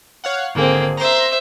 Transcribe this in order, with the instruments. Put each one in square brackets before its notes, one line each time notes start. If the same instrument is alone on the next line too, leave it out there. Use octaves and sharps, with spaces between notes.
[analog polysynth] C#5 F5 F#5
[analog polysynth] G#1 D3 G#4 [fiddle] A#3 C4
[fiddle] C5 E5 [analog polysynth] A#5 C6